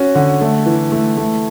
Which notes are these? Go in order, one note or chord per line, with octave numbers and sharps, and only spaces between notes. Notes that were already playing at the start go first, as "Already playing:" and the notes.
Already playing: C#4 F#4
D3
A3
E3
A3
A3